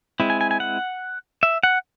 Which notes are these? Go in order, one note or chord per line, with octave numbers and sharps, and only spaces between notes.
G#3 C4 E4
G#5
G#5
G#5
F#5
E5
F#5